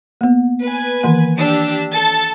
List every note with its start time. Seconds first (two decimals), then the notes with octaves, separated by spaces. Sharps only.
0.21 A#3 B3
0.64 B4 G#5
1.03 D#3 E3 A#3
1.36 D4 G4 E6
1.92 A4 A5 A6